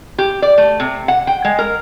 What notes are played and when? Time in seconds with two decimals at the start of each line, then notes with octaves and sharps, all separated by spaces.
0.18 G4
0.42 D5
0.58 A3
0.80 C3
1.08 F#5
1.27 G5
1.45 G#3
1.59 A#4